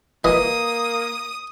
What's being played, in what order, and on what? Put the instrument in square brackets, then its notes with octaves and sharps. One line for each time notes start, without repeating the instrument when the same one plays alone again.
[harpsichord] E3 D#5 [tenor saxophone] A#3 [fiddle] D#6